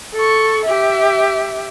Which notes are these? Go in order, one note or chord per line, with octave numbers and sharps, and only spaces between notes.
A4 C#6
G4 E5